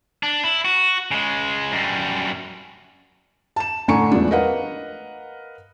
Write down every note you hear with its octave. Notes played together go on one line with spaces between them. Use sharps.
D4
E4
F#4
C#3 G#3
F#2 G3
A5 E7
A2 D3 G#5 A#5 C#6 C#7
E2 F3 G#3 A3 D4
A#4 B4 D#5 F5 F#5